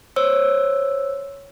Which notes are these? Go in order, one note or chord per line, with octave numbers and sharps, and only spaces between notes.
C5 C#5 E6